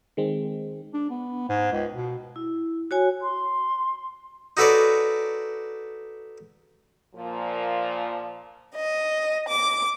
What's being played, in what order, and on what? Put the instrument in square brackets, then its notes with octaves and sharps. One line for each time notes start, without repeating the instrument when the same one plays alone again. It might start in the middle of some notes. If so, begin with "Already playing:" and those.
[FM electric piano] D#3 G#3 C4
[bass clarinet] D4
B3
G#2
C#2
B2
[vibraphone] E4
F#4 C#5 G#5
[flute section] C6
[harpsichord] D#4 F#4 A4 B4 C#5 D5
[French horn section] A#2 F3
[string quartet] D#5
D6